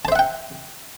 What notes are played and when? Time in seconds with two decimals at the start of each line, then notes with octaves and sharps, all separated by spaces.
0.05 A5
0.08 C5
0.12 E5
0.15 F#5
0.19 G5